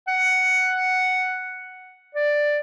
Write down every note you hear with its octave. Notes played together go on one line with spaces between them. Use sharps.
F#5
D5